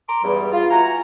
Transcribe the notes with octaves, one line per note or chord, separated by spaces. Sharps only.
A#5 C6 D6
E2 G2 G3
F4
E4 F#4 G#5 A#5